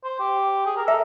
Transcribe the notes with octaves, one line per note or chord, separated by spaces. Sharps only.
C5
G4
G#4
A#4
A4 E5